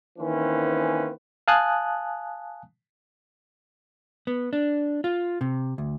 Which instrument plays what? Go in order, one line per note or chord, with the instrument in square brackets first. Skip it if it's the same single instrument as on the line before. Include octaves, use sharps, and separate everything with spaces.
[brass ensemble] D#3 E3 A#3 C4 C#4 B4
[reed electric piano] F5 G#5 A5 D#6 F#6
[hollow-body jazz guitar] B3
D4
F4
C3
D2